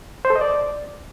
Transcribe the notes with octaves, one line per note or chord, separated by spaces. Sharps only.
C5
A4
D#5
D5